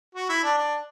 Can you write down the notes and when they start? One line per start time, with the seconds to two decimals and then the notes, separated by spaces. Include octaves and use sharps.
0.15 F#4
0.29 E4
0.44 D4
0.58 D4